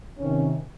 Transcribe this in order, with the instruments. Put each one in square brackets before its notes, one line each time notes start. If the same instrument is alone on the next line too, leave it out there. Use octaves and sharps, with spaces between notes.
[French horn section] C3 D#3 C#4